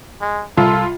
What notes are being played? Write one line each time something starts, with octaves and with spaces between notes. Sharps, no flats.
G#3
C2 F4 A4